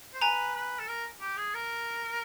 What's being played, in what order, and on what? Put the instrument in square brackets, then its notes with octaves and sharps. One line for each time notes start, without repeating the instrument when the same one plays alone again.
[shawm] C5
[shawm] B4 [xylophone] G#5 A#5
[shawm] B4
A4
A#4
G4
G#4
A#4